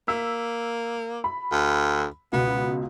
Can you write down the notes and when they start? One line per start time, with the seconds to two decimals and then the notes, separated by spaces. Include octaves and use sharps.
0.08 A#3 E6 B6
1.24 B5
1.52 D2
2.33 C#2 B2 B3